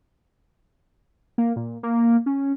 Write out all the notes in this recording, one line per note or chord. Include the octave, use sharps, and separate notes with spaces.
A#3
A#2
A#3
C#4